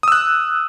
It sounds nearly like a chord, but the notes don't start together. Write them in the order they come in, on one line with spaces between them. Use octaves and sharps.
D#6 E6 F#6